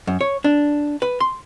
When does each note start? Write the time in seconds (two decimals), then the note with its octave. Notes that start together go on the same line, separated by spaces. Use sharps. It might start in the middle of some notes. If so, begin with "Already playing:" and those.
0.07 F#2
0.21 C#5
0.44 D4
1.02 B4
1.20 C6